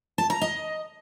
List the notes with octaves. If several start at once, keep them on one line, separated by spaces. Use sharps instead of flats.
A5
A#5
D#5